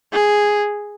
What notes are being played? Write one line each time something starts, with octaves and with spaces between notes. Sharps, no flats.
G#4